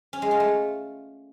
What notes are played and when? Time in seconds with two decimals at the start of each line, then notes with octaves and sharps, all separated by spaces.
0.13 C#4
0.22 G#3
0.31 F4
0.40 A3